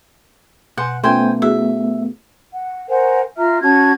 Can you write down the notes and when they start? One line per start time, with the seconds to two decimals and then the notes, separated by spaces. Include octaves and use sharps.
0.78 B2 F#5 G#5 C6 G6
1.04 A3 B3 C#4 F4 C5 G5 G#5
1.42 E4 F#4 G#4 E5
2.51 F#5
2.89 A#4 C5 F#5 G#5
3.38 F4 E5 A#5 F6
3.62 C#4 F#4 A5 G#6